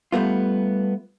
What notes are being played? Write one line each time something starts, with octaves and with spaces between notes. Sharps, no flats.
G3 A3 B3 F4